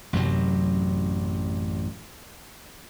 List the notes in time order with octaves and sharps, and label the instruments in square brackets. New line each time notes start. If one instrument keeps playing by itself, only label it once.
[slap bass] A1 F#2 C3 F#3